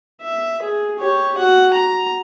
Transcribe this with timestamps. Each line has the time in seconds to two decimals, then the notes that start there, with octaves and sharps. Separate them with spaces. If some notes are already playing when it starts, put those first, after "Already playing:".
0.21 E5
0.62 G#4
0.98 G4 C#5
1.37 F#4 F#5
1.73 A#5